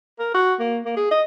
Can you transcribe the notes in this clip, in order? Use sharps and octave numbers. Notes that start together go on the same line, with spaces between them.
A#4
F#4
A#3
A#3
G#4
D#5